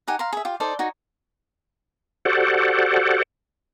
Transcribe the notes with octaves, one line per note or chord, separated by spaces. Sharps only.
D#4 G4 F#5 G#5
F5 A#5 C6
G#4 E5
F4 G4
D#4 A4 C5 D5
D#4 F#4 C#5
F#4 G4 A4 C5 D5 F#5